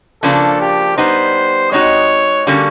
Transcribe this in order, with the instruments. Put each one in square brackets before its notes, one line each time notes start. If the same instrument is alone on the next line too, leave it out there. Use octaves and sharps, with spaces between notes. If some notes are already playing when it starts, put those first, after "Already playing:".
[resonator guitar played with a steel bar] C#3 F3 A#3 D4 [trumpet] A4
[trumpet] G4
[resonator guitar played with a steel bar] G3 B3 D#4 [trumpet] C5
[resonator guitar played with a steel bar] G#3 C4 D#4 F#4 [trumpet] C#5
[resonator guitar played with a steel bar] D3 G3 A#3 C#4 F#4